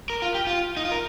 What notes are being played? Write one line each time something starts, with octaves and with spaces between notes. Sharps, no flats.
A#4
F4
G4
F4
D#4
F4
A#4